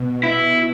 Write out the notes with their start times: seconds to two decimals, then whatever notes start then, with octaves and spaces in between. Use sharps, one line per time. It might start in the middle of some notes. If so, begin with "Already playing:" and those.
Already playing: B2
0.23 E4